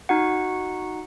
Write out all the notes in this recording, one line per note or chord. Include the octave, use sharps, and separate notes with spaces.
D#4 F#4 F#5